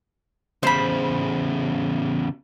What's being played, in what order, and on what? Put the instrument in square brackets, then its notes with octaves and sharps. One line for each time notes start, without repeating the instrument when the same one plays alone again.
[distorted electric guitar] E2 C#3 [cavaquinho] C5 B5